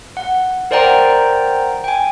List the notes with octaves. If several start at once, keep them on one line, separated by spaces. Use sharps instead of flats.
F#5
A#4 C5 D5 F#5 G5 A#5
G5 G#5